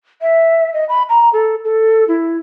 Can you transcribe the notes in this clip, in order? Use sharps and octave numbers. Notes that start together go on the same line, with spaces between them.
E5
D#5
B5
A#5
A4
A4
E4